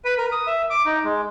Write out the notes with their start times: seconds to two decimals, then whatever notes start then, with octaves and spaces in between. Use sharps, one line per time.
0.05 B4
0.17 A#4
0.32 D#6
0.47 E5
0.70 D6
0.85 D#4
1.04 G#3